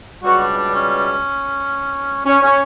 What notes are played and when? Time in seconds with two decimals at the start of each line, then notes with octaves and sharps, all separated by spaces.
0.23 C#2 B2 G3 F#4
0.40 D4
0.57 D4
0.74 C#4
2.25 C#4
2.42 C#4